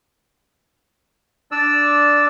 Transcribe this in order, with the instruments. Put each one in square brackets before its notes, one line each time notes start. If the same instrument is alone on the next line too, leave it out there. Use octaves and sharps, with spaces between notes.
[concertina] D4 D5 E6